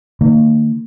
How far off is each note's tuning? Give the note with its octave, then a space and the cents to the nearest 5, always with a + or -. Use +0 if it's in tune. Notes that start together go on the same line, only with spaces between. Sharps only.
D#3 -35 A#3 -40